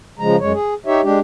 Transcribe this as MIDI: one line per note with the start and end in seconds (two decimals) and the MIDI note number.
0.19 0.36 49
0.19 0.36 53
0.19 0.36 56
0.19 0.36 82
0.40 0.52 42
0.40 0.52 56
0.40 0.52 73
0.53 0.74 68
0.86 1.01 63
0.86 1.01 67
0.86 1.01 73
0.86 1.01 76
1.03 1.20 56
1.03 1.20 62
1.03 1.20 67